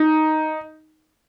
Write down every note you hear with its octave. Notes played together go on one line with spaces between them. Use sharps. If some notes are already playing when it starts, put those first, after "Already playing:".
Already playing: D#4